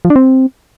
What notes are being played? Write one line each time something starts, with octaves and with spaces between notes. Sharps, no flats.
F3
D4
C4